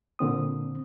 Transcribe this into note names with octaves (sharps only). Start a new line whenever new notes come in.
A#2 D3 C4 D#6